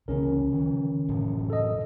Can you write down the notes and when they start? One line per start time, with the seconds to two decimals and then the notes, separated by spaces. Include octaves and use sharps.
0.08 C#2 C#3 E3 C#4 A#4
0.53 D#3 F3
1.08 F#2 A2 E3
1.50 A4 D#5